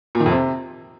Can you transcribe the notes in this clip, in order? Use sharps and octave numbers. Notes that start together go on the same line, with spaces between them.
A#2
D#3
F2
C3